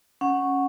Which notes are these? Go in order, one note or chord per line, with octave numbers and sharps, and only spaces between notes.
C#4 F#5